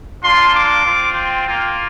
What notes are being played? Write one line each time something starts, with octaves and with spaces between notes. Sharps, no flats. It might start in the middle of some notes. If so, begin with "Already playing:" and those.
A#3 D4 F4 C6
D6
C4 F4
G5
A#3 F4